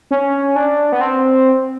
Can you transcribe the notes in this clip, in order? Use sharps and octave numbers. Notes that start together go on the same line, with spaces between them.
C#4
D4
B3
C4